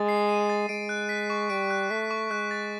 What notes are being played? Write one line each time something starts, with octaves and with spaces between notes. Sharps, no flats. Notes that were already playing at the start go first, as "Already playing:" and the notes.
Already playing: G#3 A6
C7
D#7
A6
G#3 D7
F#6
B6
C#6
G3 D7
F#6
A3 B6
C#6
G#3 F#6
A6